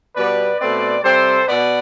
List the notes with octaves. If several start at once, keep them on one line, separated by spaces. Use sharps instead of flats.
B2 G3 B3 B4 D5
B2 A3 C4 B4 D5
C3 G3 C4 A4 C5
B2 B3 B4 D5